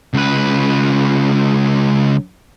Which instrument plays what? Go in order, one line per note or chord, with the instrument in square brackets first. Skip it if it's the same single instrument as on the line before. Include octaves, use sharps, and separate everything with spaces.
[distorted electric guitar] C#2 B4